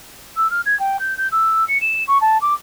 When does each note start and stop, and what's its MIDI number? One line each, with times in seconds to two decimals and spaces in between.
0.37 0.47 88
0.50 0.61 89
0.66 0.78 92
0.80 0.97 79
1.00 1.16 91
1.17 1.27 91
1.32 1.64 88
1.68 1.78 97
1.81 2.04 100
2.08 2.18 85
2.21 2.40 81
2.42 2.54 86